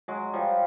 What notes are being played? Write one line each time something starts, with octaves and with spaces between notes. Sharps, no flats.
F#3 G#3
F3 G3